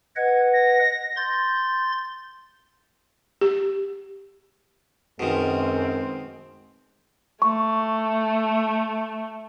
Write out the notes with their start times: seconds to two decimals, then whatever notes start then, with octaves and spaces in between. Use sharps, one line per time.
0.16 B4 D#5 F#5 G#6
0.53 A#6
1.17 C6 G6 A6
3.41 G4
5.19 F#2 B2 D#3 G#3 C4
7.42 A3 C#6